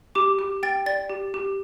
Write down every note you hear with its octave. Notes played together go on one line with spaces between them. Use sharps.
G4 D6
G4
G5 A6
D5 A6
G4
G4